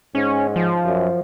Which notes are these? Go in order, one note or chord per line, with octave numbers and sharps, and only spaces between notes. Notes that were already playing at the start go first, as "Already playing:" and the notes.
G#2 C#4
F3
F#2